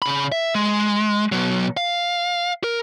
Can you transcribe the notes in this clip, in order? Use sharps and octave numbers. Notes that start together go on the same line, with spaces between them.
C#3 B5
E5
G#3
B2 F#3
F5
A#4